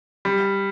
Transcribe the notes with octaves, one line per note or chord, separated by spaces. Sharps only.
G3